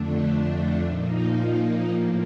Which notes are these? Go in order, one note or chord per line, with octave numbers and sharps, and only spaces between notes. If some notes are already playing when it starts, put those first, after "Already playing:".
Already playing: F2 D3 A3 D4
A#2 F3 A#3 D#4
A2 F3 A#3